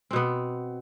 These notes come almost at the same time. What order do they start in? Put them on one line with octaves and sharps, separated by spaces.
C4 B2 B3